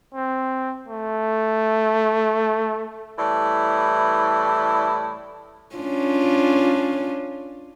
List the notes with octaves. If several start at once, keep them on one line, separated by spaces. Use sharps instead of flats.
C4
A3
A2 E3 G3
C#4 D4 F4